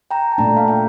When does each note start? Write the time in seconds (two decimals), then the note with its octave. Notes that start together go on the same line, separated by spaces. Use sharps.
0.11 G5 A#5
0.32 A5
0.38 A#2 A3 D4 G5 A#5
0.57 F5
0.68 G5